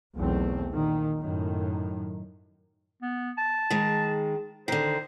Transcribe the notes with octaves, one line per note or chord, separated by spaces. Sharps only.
B1 E2 B2 A3 C4
A#2 D#3
F#2 A2 D#3
B3
A5
D#3 G#3
D3 D#3 C5